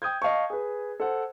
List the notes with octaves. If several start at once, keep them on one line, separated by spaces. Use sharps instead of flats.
G5 D#6 G6 G#6
D#5 F5 A5 C#6
G#4 B4
A4 C5 F#5